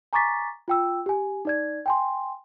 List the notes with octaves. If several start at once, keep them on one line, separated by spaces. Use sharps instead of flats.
G#5 A#5 C#6 D6 A6 B6
F4 G5 E6
G4 G#5
D#4 D5 G#6
G5 G#5 C6